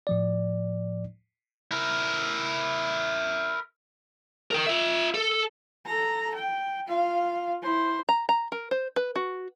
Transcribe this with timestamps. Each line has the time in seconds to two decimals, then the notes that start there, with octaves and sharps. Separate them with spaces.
0.07 A2 F3 D5
1.71 E4 A#4
4.51 A#4 G5
4.66 F4 E5
5.14 A4
5.86 A4 A#5
6.35 G5
6.87 F4 F5
7.63 E4 C5
8.09 A#5
8.29 A#5
8.52 A#4
8.71 C5
8.96 B4
9.16 F#4